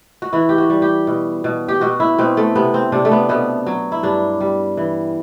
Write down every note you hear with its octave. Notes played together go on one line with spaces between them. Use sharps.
F#4
E3 E4
G4
F#4
G3
G4
B2
B2
G4
B2 F#4
E4
B2 C4
A3
C3 B3
C4
C3 D4
A3
B3
B2 B3
F#3
E4
G2 D4
G3
E3